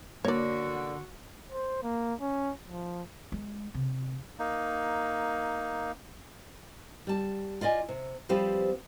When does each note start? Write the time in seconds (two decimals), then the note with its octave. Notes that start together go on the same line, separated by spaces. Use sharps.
0.25 D3 A#3 F#4 C#5 D5
1.50 C5
1.82 A#3
2.21 C#4
2.68 F3
3.32 G#3
3.74 C3
4.39 A#3 D#4
7.07 G3 A5
7.61 F4 D5 D#5 G#5
7.89 C3
8.29 F3 G3 C4 G4 B4